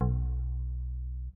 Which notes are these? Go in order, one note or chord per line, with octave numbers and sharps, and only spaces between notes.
B1